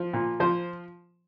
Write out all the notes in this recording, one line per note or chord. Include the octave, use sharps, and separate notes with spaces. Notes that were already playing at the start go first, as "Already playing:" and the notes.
Already playing: F3
A#2
F3 C5